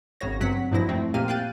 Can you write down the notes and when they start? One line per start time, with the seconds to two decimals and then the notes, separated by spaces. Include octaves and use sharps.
0.21 G#1 C#3 F#4 C#5 A#6
0.40 G2 F#3 C4 F#5 B6
0.71 G2 A#2 F3 F#3 E4 A#6
0.88 F2 A3 C4
1.14 A#2 A#3 C4 G4 F6 D#7
1.28 F5 G5 F#6 G6 A6 D#7